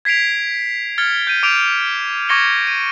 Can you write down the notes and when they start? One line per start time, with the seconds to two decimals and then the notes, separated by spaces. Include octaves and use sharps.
0.05 G#6 B6 C7 D7 F7
0.98 F6 G#6 A6 C#7 G7
1.27 G6 D#7
1.43 D6 D7 F7
2.29 C#6 D6 G#6 A#6 C#7 G7
2.67 D#7